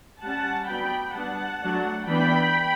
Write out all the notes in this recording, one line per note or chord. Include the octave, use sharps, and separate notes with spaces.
G3 C#4 F#5 A5
F#3 B3 D4 G5 B5
G3 B3 D4 F#5 A5
F#3 A3 D4
E3 B3 D4 G5 B5